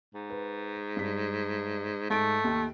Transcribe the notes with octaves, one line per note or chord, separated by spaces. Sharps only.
G#2
B4
G2 B6
G#2 A3 D7
D#2